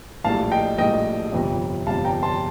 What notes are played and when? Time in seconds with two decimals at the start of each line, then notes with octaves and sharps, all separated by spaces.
0.24 A#1 A2 G3 F5 A5
0.52 D#5 G5
0.78 A#1 A2 G3 D#5 G5
1.32 G1 F2 C3 G3
1.86 G1 F2 C3 G3 F5 A5
2.05 G5 A#5
2.23 A5 C6